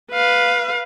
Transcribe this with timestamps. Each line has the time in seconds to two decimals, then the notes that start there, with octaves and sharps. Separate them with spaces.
0.12 B4 F5